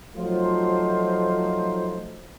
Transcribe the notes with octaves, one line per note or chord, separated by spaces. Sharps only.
F3 F#3 A3 D#4 F4 C5